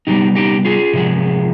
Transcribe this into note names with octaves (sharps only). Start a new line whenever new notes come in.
C3 G3 B3 D#4 G4
D#4 G4
F4 G#4
C3 F3 G#3